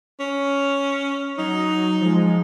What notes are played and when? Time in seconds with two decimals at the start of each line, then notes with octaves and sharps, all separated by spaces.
0.20 C#4
1.38 F#3 D#4
2.01 F3 G#3